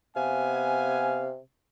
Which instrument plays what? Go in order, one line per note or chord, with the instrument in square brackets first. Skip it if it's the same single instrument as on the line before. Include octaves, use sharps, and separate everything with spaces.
[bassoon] C3 [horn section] B3 F5 G#5